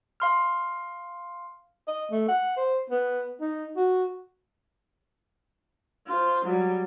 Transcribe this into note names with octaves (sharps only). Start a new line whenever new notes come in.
F5 C6 F6
D#5
A3
F#5
C5
B3
D#4
F#4
F4 C5
F#3 G3